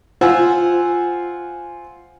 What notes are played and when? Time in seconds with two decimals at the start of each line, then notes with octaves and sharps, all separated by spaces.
0.21 F4 C5 F#5 G#5 E6